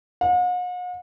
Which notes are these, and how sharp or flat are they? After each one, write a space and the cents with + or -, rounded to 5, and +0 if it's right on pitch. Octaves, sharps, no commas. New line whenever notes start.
F#5 -45